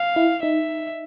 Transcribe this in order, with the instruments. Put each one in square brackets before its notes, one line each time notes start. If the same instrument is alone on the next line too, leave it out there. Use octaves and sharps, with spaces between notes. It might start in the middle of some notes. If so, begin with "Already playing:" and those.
Already playing: [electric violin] F5
[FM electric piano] E4
[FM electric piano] D#4 [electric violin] E5